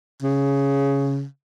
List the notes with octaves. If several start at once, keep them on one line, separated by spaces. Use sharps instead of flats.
C#3